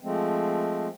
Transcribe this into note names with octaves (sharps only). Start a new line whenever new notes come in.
F3 G#3 A3 C4